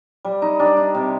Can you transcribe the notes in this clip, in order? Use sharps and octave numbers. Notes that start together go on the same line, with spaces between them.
G3
D#4
G3 D4
D#4
C3